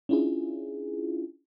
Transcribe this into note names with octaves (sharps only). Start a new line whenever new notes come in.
C#4 D4 E4 F4 G#4